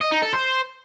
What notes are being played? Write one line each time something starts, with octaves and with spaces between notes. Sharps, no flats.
D#5
D#4
A4
C5